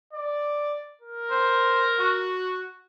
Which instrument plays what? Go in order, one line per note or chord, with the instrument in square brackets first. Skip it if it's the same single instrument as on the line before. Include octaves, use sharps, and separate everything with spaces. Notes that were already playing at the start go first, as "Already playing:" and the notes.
[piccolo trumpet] D5
A#4
[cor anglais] C5
F#4